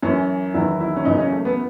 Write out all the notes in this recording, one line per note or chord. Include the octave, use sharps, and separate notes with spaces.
F#2 E3 C#4
E2 D#3 F#3 E4
E4
C#4
F#2 C#3 E3 D#4
C#4
A3
B3